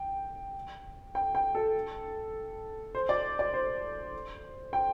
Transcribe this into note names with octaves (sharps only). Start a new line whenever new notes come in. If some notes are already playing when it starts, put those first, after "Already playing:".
Already playing: G5
G5
G5
A4
C5
D5
D5
C5
G5